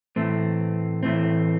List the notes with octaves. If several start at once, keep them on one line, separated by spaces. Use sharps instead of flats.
A2 E3 A3 C4
A2 E3 A3 C4